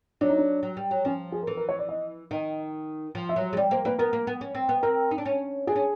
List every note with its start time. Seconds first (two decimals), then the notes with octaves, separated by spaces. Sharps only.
0.21 F#3 D4
0.29 D#4
0.38 D4
0.63 F#3
0.77 G3
0.91 F#3
1.05 F3 C#4
1.32 G#4
1.43 A#4
1.47 E3 A4
1.57 A#4
1.69 C#5
1.79 D5
1.89 D#5
2.31 D#3 D#5
3.15 F3
3.29 E5
3.36 F#3
3.53 G#3
3.57 G3 D5
3.71 A#3 C5
3.85 A#3 B4
3.99 B3 A#4
4.13 A#3
4.27 B3
4.41 C#4
4.55 C4
4.69 B3
4.83 C4 A#4
5.11 D#4
5.18 D4
5.25 C#4
5.67 D4 G#4
5.76 C#4